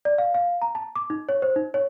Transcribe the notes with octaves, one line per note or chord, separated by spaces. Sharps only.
D5
F5
F5
A#5
A5
D6
D#4
C#5
C5
D#4
C#5